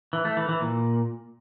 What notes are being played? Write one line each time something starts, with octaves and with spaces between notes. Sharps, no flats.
E3
A3
E3
E3
A#2